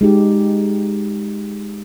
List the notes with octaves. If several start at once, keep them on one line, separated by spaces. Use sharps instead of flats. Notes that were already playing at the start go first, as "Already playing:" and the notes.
G#3 D#4 G4